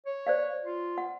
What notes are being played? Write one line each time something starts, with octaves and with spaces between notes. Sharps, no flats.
C#5
C5 D5 F5
F4
F#5